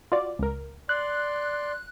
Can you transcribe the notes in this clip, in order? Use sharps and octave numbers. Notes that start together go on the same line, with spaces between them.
F4 F#4 D5
C#2 A#4
D5 C6 F#6